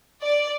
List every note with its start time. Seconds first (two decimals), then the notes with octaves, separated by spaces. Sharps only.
0.22 D5